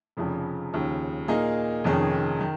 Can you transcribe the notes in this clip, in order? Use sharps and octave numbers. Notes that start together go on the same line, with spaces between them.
F1 F2 C#3 F3
D#2 C#3 F3
A#2 A#3 D#4 G#4
F1 F2 D#3 C#4 G#4
D#3